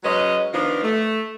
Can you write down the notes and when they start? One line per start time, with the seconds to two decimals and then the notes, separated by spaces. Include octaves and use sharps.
0.03 F#3 G#3 C#4 B4 D#5
0.53 D#3 F3 B3 D4 F4
0.82 A3